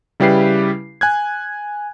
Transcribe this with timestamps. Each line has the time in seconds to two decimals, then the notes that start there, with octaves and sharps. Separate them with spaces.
0.20 C#3 G3 E4 G4 B4 C7
1.01 G#5 F#6 G#6